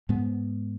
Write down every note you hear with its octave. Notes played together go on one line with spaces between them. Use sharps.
G#2 G#3 B3